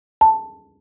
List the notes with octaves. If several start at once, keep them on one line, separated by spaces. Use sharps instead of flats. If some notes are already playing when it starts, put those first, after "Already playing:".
A5